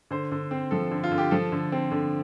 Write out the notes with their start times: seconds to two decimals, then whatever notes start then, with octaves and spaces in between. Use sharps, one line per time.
0.11 D3 C5
0.32 D3
0.51 C4
0.71 F3 A4
0.91 D3
1.04 F4
1.12 D3
1.18 G4
1.31 F3 A4
1.52 D3
1.72 C4
1.91 D3